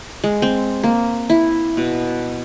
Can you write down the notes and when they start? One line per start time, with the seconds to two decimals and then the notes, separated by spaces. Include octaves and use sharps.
0.24 G#3
0.42 C4
0.84 A#3
1.30 E4
1.77 B2